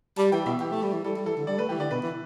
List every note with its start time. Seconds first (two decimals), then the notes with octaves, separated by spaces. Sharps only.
0.17 G3 A5
0.32 E3 G5
0.46 B2 E5
0.61 E3 G4
0.72 A3
0.83 G3
0.93 E3
1.04 G3 A4
1.15 G3
1.26 E3 A4
1.37 D3
1.47 G3 D5
1.58 A3 B4
1.69 E3 G4
1.80 D3 D5
1.91 B2 B4
2.02 E3